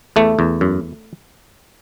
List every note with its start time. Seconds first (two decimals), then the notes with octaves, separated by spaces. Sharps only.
0.16 E2 A3
0.39 E2
0.61 F#2